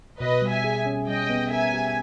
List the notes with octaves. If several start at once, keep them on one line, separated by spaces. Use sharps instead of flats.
B2 B4 D#5
G3
E5 G#5
G#4
C#4
G3 D#5 G5
B3
A#4 E5 G#5
G4